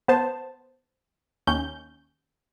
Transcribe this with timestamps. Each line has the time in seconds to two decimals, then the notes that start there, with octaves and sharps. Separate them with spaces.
0.08 B3 C5 A5
1.47 D#2 C#4 G6